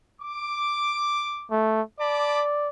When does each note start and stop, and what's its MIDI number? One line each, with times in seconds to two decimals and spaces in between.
0.21 1.51 86
1.51 1.82 57
2.00 2.69 74
2.00 2.45 81
2.00 2.45 83
2.00 2.45 86